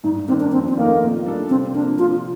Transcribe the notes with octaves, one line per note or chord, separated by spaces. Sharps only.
G2 D#4
D#3 A#3 C4 D4
D4
F2 C4
C4
D#3 A3 A#3 D#4 A#4
A#2
G3 D4 A4
C3 C4
F3 A#3 D4
C3 F4